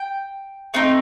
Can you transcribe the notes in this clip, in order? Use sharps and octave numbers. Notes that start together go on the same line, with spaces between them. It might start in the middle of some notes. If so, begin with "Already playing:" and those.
Already playing: G5
A3 C4 D#4